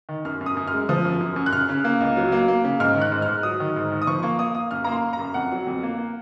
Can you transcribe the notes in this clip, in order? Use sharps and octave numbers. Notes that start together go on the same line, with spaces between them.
D#3
F#2 F6
F#2
D#6
F#2
F6
G#3
F3 D#6
F#2
F#2
F#2
F#6
C#3 F6
C#3
A#3
C#2
F#3
A#3
A#3
C#3
G#2 F6
D#3
F#6
G#2
F6
G#2
F#3 D#6
D#3
G#2
D#3
D#6
F3 C#6
A#3 C#6
A#3 D#6
A#3 D#6
F#2 F6
A#3 A#5
C6
F#2
A#5
F#2
F2 F#5
F#3
F2
A#3
A#3